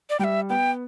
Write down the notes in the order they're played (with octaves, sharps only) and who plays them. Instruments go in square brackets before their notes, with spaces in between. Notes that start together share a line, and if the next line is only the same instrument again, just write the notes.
[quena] D5
[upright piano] G3 [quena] G5
[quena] E5
[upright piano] B3 [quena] G5